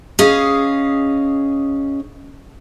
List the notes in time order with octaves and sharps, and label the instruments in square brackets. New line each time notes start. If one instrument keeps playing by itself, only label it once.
[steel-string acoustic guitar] C#4 G#4 D#5 F5